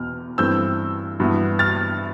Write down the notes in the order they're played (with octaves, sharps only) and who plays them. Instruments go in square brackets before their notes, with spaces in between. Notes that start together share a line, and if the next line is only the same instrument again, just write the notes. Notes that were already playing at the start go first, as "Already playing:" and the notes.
Already playing: [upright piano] E2 B2 F6
G2 E3 A3 C4 E6 G6
G2 E3 B3 E4
F6 A6